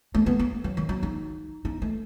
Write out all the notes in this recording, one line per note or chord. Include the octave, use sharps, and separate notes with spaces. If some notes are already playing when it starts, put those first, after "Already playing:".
A3
B3
B3
F#3
D#3
F#3
D#4
D#4
A3